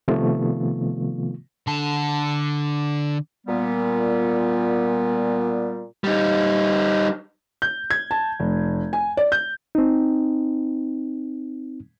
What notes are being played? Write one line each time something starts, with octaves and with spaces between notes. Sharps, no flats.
C3 D#3 F3 A3 B3 F4
D3 A5
A#2 G3 B3
G3 D#4
G6
G#6
A5
F1
G#5
D5
G6
C4 D#4